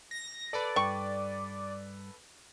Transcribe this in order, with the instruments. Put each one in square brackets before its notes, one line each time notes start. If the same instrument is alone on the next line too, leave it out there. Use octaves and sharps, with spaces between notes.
[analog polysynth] A#6
[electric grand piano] A4 B4 [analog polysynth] D5
[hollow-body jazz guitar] G2 G5 [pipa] C#6